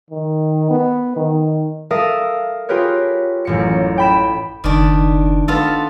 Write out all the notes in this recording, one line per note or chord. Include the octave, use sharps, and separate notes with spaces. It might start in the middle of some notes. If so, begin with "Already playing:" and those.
D#3
B3
D#3
A4 A#4 E5 F5 D#6
F4 G4 G#4 A#4 B4 C#5
A1 F#2 C#7
G5 B5 E7
F#1 D#3 D4 B5
B3 F4 A4